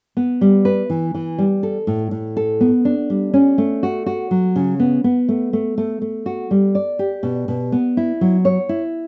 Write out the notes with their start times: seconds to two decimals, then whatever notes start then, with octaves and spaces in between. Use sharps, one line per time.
0.17 B3
0.41 G3
0.65 B4
0.90 E3
1.14 E3
1.38 G3
1.63 A4
1.87 A2
2.11 A2
2.37 A4
2.61 B3
2.85 D4
3.10 G3
3.34 C#4
3.58 A3
3.83 F#4
4.06 F#4
4.31 F#3
4.56 C#3
4.80 B3
5.04 B3
5.29 A3
5.53 A3
5.78 A3
6.02 A3
6.26 F#4
6.51 G3
6.75 D5
6.99 G4
7.23 B2
7.48 B2
7.72 B3
7.97 E4
8.21 F#3
8.45 C#5
8.69 E4